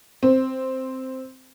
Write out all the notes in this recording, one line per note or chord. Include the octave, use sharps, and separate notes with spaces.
C4